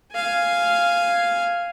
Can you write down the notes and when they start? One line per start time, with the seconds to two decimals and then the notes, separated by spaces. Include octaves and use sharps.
0.13 F5 G#5